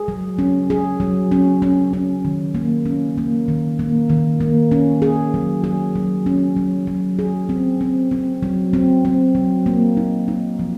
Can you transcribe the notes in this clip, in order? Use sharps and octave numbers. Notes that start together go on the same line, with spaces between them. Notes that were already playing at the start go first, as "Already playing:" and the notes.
Already playing: G#4
F#3
C#4
G#4
F#3
C#4
C#4
C#4
D#3
A#3
C#4
A#3
D#3
A#3
D#3
A#3
C#4
G#4
F#3
G#4
F#3
C#4
F#3
F#3
G#4
C4
C4
C4
F#3
C4
C4
F#3
A#3
D#4
D#4
F3